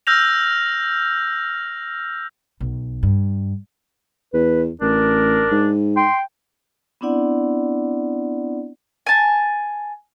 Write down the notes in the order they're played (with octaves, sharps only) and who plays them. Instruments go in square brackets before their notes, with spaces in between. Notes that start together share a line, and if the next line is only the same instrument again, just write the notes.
[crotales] E6 F6 G6 A#6 F7
[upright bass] B1
G2
[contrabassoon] E2 [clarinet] B4
[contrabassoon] A1 [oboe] D4 [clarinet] A#4
[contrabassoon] G#2
[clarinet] G5 [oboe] C6
[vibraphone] B3 C4 D4 E4 D5 F#5
[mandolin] G#5 A5